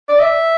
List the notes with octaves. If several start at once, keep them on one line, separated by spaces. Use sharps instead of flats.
D5
E5